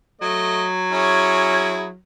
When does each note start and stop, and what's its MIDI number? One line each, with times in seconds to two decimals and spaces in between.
0.21 1.97 54
0.21 0.66 57
0.21 0.66 75
0.92 1.86 61
0.92 1.86 64
0.92 1.86 68